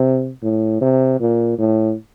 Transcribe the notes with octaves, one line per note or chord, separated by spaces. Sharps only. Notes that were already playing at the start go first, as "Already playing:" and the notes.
Already playing: C3
A2
C3
A#2
A2